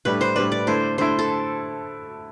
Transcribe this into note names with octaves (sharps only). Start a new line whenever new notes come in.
A2 G3 D4 B4
C5
A2 G3 D4 B4
D5
D3 A3 E4 C5
D3 A3 E4 C5
A4